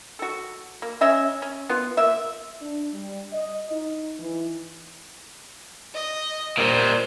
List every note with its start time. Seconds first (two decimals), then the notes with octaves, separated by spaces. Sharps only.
0.19 F#4 A4
0.82 A#3
1.01 C#4 D#5 E5 G#5
1.42 C#4
1.69 B3 F4
1.97 A#3 E5
2.61 D4
2.93 G3
3.33 D#5
3.71 D#4
4.19 E3
5.94 D#5
6.57 A#2 G3 C5